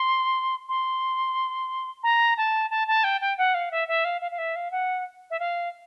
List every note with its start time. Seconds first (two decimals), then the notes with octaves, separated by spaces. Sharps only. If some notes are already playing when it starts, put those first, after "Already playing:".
Already playing: C6
0.69 C6
2.03 A#5
2.37 A5
2.70 A5
2.88 A5
3.04 G5
3.21 G5
3.38 F#5
3.54 F5
3.71 E5
3.88 E5
4.05 F5
4.21 F5
4.31 F5
4.38 E5
4.56 F5
4.71 F#5
5.30 E5
5.39 F5